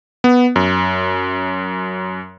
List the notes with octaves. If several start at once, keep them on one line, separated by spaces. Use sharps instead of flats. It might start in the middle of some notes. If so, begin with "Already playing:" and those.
B3
F#2